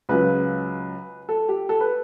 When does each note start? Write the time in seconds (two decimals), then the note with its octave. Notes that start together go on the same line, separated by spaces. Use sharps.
0.09 C#2 C#3 F#3 B4
1.29 A4
1.49 G4
1.69 A4
1.80 B4